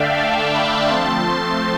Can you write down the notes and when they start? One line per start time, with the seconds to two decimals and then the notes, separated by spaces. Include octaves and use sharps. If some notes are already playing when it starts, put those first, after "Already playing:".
Already playing: D3 A3 D4 D5 E5 F5 G5
0.17 F5 A5
0.53 G5 B5
0.89 F3 A3 C4 A5 C6
1.25 A5 C6